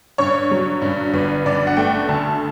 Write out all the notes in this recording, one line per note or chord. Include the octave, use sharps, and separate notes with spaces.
G2 C#5
F#3
G2
G1 B4
G2 D5
F#5
A3 G5
D2 A5